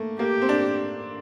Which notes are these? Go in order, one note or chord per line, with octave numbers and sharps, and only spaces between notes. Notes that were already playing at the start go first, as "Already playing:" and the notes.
Already playing: A3 A#3
A#3 G4
C4
D4